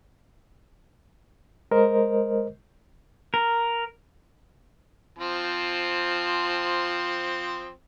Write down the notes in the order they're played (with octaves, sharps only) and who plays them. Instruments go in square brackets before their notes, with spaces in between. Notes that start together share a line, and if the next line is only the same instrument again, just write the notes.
[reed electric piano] G#3 A#4 C5 D#5
[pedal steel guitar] A#4
[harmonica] F3 C4